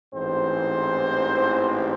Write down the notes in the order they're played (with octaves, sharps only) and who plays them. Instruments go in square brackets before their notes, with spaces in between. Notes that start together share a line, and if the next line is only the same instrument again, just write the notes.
[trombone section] A1 G#2 E3 C4 C5